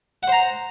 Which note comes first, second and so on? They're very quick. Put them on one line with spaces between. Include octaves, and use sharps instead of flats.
F#5 C5 A#5